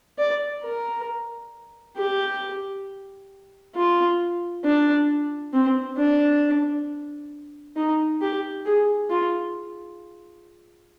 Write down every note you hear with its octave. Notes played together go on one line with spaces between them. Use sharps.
D5
A#4
G4
F4
D4
C4
D4
D#4
G4
G#4
F4